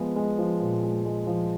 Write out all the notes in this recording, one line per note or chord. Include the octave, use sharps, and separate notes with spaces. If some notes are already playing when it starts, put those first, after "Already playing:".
Already playing: F3 G#3 B3
G#3
F3
A#2
G#3
G#3
F3